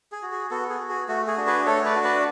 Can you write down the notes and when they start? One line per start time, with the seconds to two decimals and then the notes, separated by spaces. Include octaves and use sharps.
0.12 G#4
0.22 F#4
0.32 G#4
0.51 B3 F#4 A4
0.69 G#4
0.79 F#4
0.89 G#4
1.08 A3 F#4
1.28 G#4
1.38 D4 F#4
1.47 G#4 B4
1.66 A3 A4 C#5
1.85 B4 D5
1.95 D4 F#4
2.05 B4 D5